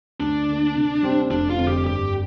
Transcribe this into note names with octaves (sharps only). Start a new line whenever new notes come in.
D2 D4
D3 A#3
C3
G3 C4 G4
F1 D4
F4
F2 D3
G4
G2 G4